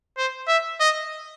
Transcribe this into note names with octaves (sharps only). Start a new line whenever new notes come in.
C5
E5
D#5